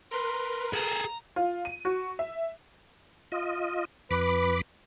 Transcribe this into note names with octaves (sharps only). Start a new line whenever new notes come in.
A#4 B4 C6
G#4 A4 A#5
F4
D#7
F#4
E5
F4 D#5
F2 B4 B5 D6